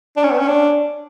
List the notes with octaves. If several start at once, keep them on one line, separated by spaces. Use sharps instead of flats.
D4
C#4
B3
C#4
D4